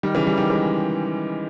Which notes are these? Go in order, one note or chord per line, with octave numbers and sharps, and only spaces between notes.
D#3 G3
C#3 E3
D#3 G3
D#3 G3
E3 G#3